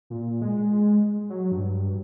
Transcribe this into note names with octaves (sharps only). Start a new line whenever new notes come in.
A#2
G#3
F#3
G2